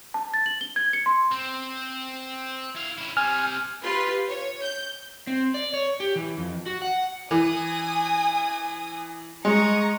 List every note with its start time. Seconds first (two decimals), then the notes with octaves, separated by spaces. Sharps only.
0.14 A5
0.34 A6
0.46 F#7
0.61 G7
0.76 G#6
0.93 C#7
1.06 C6
1.32 C4
2.75 E4 F5
2.98 C#4 E4
3.17 G3 C4 G#5 F6
3.83 F4 G4 B4 C6
4.27 C#5
4.63 G6
5.27 C4
5.54 D5
5.74 C#5
6.00 G4
6.16 E3
6.37 F2
6.66 F#4
6.82 F#5
7.31 E3 G#5 D#6
9.45 G#3 A#5 C#6 D#6